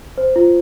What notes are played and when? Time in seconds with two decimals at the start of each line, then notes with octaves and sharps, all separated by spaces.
0.18 C5
0.36 F4